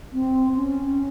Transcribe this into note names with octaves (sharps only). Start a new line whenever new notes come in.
C4
C#4